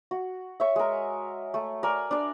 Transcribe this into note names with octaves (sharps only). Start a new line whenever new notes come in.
F#4
C#5 E5
G#3 A#4
A3
A#4 D5 G#5
D4 D5